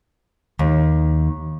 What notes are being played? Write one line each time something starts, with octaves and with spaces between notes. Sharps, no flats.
D#2